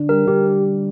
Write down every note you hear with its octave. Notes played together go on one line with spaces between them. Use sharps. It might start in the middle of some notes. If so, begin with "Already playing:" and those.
Already playing: D3 D4
G3 A#4
D3 G4